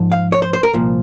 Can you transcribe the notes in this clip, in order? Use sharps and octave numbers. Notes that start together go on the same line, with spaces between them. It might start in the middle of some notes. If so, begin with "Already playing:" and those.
Already playing: G#2 F3
F5
C#5
C5
C5
A#4
C2 A#2 F3